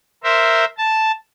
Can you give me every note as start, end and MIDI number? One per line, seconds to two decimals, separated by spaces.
0.24 0.65 70
0.24 0.65 72
0.24 0.65 76
0.78 1.12 81